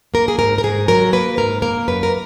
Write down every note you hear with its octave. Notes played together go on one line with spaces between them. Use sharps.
A#3 A#4
G#4
G#2 A#4
A#4
G#2 G#4
F#3 A#4
A#3 B4
G#2 A#4
A#3 A#4
F#2 B4
A#4